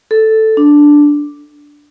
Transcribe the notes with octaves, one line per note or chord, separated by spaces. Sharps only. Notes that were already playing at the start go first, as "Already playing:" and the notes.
A4
D4